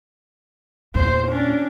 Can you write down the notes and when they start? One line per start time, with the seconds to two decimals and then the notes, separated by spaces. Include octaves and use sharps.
0.95 E2 A#2 C5
1.28 C#4 D4